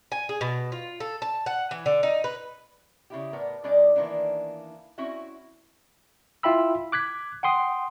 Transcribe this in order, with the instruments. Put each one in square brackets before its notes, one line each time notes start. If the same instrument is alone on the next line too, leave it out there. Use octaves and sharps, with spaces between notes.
[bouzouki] G#5
G#4
B2
F4
A4
A5
F#5
E3
D3
D#4
B4
[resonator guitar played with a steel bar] C#3 E4 G4
A2 B3 A#4 D5
B2 G3 D4 G#4 D5 D#5
D#3 E3 A#3 B3 D4
C4 C#4 E4 F#4 E5
[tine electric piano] E4 F4 E5 G5 B5 E6
D6 F#6 G#6 B6
F#5 G5 C6 D#6